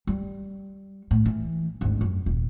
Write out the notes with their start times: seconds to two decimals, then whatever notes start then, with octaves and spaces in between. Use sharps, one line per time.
0.07 G3
1.11 A2
1.26 E3
1.81 G#1 D2
2.01 F#2
2.26 D#1